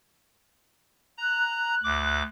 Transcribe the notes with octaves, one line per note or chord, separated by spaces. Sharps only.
A#5 F#6
D2 D6